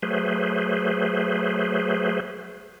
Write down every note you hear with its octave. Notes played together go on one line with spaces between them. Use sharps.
F#3 A3 G#4 B4 C5